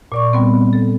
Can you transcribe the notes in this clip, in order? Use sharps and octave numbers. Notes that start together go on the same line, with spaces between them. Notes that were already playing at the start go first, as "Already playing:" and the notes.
A#2 D5 C#6
G3 B3 C4
A4